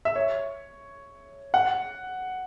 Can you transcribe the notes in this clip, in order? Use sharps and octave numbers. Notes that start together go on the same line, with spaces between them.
E5
C#5
F#5